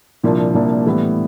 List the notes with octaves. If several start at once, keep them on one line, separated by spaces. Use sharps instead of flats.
C2 A#2 F3 A#3 D4
C2 A#2 F3 A#3 D4
A2 E3 G3 B3